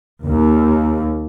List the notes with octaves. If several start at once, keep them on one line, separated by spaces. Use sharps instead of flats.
D#2